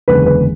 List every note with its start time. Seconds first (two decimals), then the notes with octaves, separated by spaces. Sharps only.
0.08 F#1 E2 D3 G#3 B4
0.26 B4